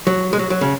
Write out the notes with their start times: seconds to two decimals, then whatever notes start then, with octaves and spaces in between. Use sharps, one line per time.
0.07 F#3
0.33 G#3
0.39 F#3
0.50 F#3
0.61 C#3